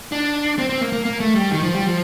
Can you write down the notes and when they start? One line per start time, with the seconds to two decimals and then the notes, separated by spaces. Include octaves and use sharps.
0.12 D4
0.58 C4
0.69 C4
0.81 A#3
0.93 A#3
1.05 A#3
1.20 A3
1.36 G3
1.52 D#3
1.63 F3
1.75 G3
1.86 F3